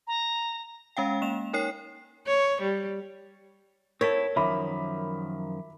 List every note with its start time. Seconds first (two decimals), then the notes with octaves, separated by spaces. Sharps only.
0.07 A#5
0.97 G#3 C#4 F5 G5
1.22 A#3 E7 F7
1.53 D#4 A#4 C#5 G5 C7
2.27 C#5
2.62 G3
4.01 C4 E4 A4 A#4 C#5
4.36 F#2 D#3 F3 E5 B5 D6